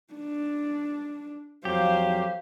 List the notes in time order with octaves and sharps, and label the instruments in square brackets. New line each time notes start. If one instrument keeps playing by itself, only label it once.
[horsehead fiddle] D4
[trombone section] F2 F#3 [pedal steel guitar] G4 [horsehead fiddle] C5 F5